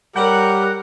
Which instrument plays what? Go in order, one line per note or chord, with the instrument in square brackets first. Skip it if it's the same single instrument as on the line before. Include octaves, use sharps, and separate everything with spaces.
[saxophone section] G3 G4 C#5 [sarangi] A#4 [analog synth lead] F#5